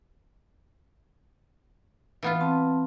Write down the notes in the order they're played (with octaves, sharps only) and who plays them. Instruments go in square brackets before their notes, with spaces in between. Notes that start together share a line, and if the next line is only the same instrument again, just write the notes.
[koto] E3 B3 F4
[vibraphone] C4 A5